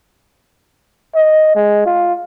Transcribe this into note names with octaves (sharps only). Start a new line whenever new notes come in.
D#5
G#3
F4